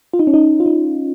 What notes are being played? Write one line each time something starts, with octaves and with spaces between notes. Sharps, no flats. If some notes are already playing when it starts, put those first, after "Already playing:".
F4
D#4
C#4
D#4
F4
D#4